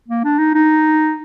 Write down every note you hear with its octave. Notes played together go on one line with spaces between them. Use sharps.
A#3
D4
D#4
D#4